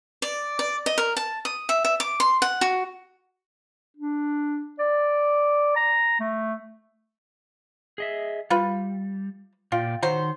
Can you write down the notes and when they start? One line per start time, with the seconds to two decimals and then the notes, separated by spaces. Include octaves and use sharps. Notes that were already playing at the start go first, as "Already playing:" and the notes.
0.22 D5
0.59 D5
0.86 D#5
0.98 A#4
1.17 A5
1.45 D#6
1.69 E5
1.85 E5
2.00 D6
2.20 C6
2.42 F#5
2.61 F#4
3.97 D4
4.79 D5
5.76 A#5
6.20 A3
7.98 G#4 D#5 E5
8.50 G3 F4 B4
9.72 A#2 F4 D5 G5
10.02 D#3 F#3 C5 C6